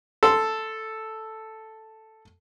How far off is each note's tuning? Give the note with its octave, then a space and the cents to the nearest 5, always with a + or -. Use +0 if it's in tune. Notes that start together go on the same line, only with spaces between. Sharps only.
A4 +0 C6 -5 E6 +0